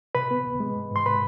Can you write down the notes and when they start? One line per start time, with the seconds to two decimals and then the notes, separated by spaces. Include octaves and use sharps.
0.15 C3 B4 B5
0.31 B3
0.46 D2
0.60 G#3
0.75 G#2
0.90 G#2
0.96 C6
1.05 C3 B4 B5